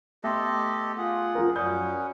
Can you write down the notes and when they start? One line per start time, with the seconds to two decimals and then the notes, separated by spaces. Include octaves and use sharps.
0.24 A3 B3 G4 A4 D#5 E5 C6
0.98 F4 G#4 F#5
1.35 F3 A#4
1.56 F#2 C#4 D5 F#5 B5 D#6 G6